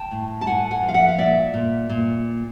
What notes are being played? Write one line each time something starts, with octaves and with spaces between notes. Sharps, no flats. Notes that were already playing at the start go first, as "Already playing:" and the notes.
Already playing: G5 A5
A2
A5
A2 F#5 G#5
F#5 G#5
F3
F5
E5 F#5
F5
A#2 D5 E5
A#2
A#2